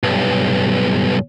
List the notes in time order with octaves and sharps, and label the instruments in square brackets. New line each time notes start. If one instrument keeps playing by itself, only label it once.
[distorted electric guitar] B1 G2